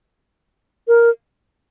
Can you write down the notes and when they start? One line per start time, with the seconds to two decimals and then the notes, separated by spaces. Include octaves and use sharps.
0.88 A#4